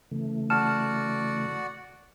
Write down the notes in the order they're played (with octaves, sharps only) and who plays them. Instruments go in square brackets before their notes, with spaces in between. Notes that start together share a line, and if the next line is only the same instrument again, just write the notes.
[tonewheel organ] C#3 E3 A3
[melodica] F#4 D5 F#5 [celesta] A5 F6 E7